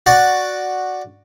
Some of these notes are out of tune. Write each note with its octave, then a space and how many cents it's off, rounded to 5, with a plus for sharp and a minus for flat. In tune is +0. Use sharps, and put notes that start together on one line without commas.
F#4 -5 D5 +0